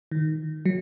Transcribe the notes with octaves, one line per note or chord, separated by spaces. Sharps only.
D#3
F#3